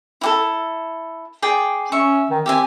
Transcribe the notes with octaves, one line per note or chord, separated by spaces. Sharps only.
E4 G4 A4
G#4 D5 G5
C#4 E5 C#6
D#3
C4 G4 E5 G#5